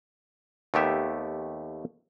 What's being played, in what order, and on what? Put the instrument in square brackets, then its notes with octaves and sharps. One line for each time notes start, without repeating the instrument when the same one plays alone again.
[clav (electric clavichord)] D#2 A3 B3 G4 E5